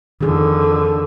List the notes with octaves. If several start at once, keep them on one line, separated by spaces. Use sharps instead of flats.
F2 D3 D#3 G#4